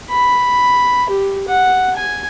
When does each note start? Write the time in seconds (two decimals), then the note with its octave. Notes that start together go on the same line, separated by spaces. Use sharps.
0.10 B5
1.09 G4
1.48 F#5
1.96 G#5